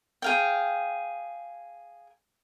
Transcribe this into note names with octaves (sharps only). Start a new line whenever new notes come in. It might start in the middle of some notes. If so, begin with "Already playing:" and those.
G#4 F5 G5